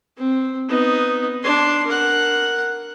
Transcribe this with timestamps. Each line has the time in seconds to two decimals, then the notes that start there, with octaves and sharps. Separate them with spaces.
0.17 C4
0.69 B3 D#4
1.43 D4 C6
1.86 A#4 F#5